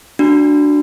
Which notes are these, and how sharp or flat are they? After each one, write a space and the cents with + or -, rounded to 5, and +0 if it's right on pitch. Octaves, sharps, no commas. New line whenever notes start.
D4 +0 F#4 +0